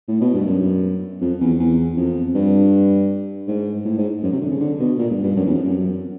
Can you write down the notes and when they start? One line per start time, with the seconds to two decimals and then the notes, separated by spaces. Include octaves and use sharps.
0.08 A2
0.21 B2
0.34 G2
0.46 F#2
1.21 F2
1.41 E2
1.59 E2
1.97 F2
2.35 G2
3.48 G#2
3.85 A2
3.98 G#2
4.23 F#2
4.32 C3
4.41 D3
4.51 C#3
4.61 D3
4.80 B2
4.98 A#2
5.10 G2
5.23 G2
5.36 F#2
5.46 E2
5.55 F2
5.64 F#2